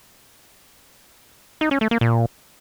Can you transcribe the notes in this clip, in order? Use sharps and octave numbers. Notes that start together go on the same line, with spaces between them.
D#4
C#4
A3
A#3
A#2